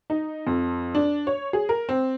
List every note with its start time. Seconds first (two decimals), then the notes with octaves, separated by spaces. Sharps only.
0.10 D#4
0.47 F2
0.95 D4
1.27 C#5
1.53 G#4
1.69 A#4
1.89 C4